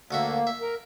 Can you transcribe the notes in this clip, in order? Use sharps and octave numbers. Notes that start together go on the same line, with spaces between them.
D2 A#3 F#4 E5
E5
A#4